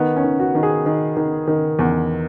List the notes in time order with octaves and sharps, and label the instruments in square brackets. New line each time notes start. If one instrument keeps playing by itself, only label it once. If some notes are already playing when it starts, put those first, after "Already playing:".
Already playing: [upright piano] D#3 B3
C#4
D#3
F#4
D#3
G#4
D#3
D#3
D#3
E2